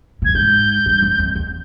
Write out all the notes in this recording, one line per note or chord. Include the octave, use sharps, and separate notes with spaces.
A#2
A2 G#6
G#2 G6
G2
F#2
F2
E2